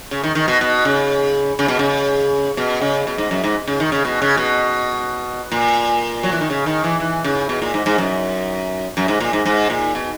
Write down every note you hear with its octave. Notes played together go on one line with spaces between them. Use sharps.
C#3
D#3
D#3
B2
B2
C#3
C#3
B2
C#3
B2
C#3
B2
G#2
F#2
G#2
C#3
D#3
C#3
B2
C#3
B2
A#2
F#3
E3
D#3
C#3
D#3
E3
E3
C#3
B2
A#2
G#2
G#2
F#2
F#2
G#2
A#2
G#2
G#2
A#2
B2